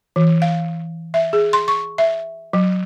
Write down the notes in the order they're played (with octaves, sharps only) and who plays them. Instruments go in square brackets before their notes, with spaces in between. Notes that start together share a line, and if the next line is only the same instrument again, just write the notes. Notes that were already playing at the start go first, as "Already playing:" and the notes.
[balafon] E3
F5
E5
G#4
C6
C#6
E5
F#3